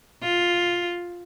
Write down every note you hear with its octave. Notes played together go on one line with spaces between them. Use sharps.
F4